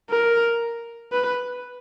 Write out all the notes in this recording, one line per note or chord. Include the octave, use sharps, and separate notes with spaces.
A#4
B4